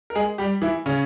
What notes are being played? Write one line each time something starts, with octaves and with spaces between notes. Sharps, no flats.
A#4
G#3 G#4
G3 G4
E3 E4
C#3 C#4